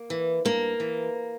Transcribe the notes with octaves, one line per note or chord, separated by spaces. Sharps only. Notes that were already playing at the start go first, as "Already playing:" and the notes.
Already playing: A#3
E3
G2 A#3
E3